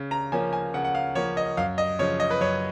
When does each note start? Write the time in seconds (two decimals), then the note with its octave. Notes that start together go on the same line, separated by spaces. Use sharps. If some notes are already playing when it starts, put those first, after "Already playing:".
Already playing: C#3
0.11 A#5
0.32 F3 A#3 C#4 G#5
0.53 G#5
0.74 C#3 F#5
0.84 F#5
0.95 F5
1.15 F3 A#3 C#4 C#5
1.37 D#5
1.57 F#2 F5
1.78 D#5
1.99 C#3 F3 C#5
2.20 D#5
2.31 B4
2.41 F#2 C#5